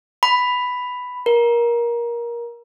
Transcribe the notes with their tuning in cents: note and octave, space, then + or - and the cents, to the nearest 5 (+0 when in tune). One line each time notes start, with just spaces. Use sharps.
B5 +5
A#4 +20